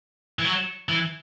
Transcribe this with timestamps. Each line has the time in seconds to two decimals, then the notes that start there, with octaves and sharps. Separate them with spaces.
0.39 E3
0.45 F#3
0.89 E3